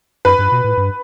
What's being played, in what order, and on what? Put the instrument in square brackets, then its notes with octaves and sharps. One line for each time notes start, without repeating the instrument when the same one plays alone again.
[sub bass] F#2 [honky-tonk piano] B4
[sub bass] G2
B2
A2
G2